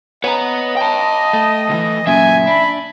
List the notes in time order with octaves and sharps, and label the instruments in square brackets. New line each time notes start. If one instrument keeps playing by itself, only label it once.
[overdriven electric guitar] B4 F#5 [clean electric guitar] C#5 G#5 A#5 [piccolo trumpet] D#5
[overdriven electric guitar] G5 A5
[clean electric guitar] A3
[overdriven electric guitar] C#2 E3
[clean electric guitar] F#2 A#2 C#3 [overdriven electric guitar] E5 [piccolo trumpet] G#5
[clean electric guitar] D4 [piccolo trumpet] B5